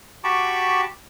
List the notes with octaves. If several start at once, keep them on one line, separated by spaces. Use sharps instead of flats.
F#4 G4 A5 B5 C#6 D6